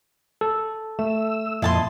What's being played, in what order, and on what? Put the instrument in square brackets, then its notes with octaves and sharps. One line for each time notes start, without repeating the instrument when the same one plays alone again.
[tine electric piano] A4
[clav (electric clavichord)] A3 [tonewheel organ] E6
[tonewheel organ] F2 A#2 D#5 [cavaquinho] E4 A5 C6